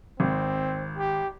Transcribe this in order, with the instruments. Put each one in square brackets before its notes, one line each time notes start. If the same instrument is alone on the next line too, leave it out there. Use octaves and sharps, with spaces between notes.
[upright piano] G#1 [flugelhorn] C4
[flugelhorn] G4